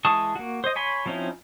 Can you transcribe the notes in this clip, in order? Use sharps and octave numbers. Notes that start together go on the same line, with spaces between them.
E3 G#3 A5 C#6 D#6
A#3 F#4
C5 D#5
C#5 G#5 B5 C6
F3 C4 C#4 D#4 E4